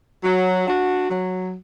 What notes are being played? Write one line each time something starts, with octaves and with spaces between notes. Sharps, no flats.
F#3
D4 F#4
F#3